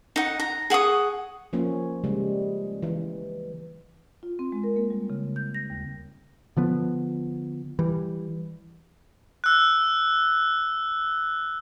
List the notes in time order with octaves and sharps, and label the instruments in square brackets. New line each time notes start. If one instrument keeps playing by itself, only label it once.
[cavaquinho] D#4 F#5
A#5
G#4 F#5 C#6 D#6
[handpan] F3 A#3 C#4
C#3 G3 G#3
E3
[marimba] F4
C4
G#3
A#4
A#3
G3
C#3
G6
A#6
D#2
[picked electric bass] D3 F3 B3
E3 G3
[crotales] E6 F#6